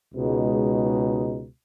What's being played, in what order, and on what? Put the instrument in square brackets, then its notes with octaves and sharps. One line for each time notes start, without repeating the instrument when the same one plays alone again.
[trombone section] C#2 B2 G#3 D#4